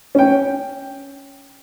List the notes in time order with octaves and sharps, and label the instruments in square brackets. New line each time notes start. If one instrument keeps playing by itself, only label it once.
[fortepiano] C#4 G5